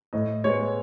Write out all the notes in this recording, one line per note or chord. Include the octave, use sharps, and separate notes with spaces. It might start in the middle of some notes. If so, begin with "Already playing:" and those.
A2 D#5
G#3 B3 C#5